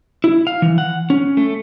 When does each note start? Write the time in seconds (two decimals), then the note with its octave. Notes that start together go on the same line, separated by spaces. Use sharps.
0.24 E4
0.47 F5
0.62 E3
0.78 F#5
1.10 C#4
1.37 A3